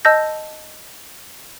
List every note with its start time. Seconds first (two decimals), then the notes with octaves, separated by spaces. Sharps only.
0.05 D#5 A5 E6 G6 A#6